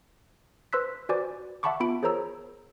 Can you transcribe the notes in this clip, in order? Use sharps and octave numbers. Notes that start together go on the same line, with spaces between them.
B4 C5 C6 E6 F#6 B6
F#4 B4 C5 D5 G#5 D6
E5 F#5 A5 B5 C#6 D6
B3 F4 B5 D7
G#4 A#4 C5 C#5 A#5 E6